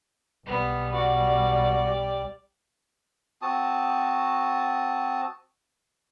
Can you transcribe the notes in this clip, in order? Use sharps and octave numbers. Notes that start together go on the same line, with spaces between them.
B1 G3 B3
F#4 D5
G4
C4 F#4 A5 D#6